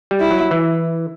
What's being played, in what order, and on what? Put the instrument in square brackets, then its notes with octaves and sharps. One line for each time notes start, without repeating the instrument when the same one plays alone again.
[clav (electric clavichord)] G3
[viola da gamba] E4
[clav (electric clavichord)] F#3
E3